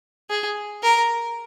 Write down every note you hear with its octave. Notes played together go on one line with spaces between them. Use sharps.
G#4
A#4